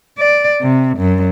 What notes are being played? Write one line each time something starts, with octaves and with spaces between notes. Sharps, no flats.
D5
C3
F#2